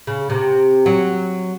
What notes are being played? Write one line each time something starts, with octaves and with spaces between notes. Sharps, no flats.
C#3
C3
F#3